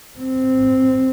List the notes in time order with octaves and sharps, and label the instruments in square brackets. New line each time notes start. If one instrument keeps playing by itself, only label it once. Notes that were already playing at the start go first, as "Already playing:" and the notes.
[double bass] C4